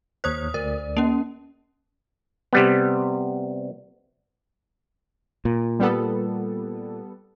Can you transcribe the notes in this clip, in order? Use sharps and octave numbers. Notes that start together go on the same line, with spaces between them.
D#2 C5 C#5 D#6 F#6
D2 A#4 D5
A#3 C#4
C3 G3 B3
A#2
G3 B3 A4